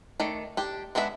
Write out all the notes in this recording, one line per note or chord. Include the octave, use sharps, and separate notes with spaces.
D#3 A3 D5
D4 G4
G#3 B3 D4 G#4 E5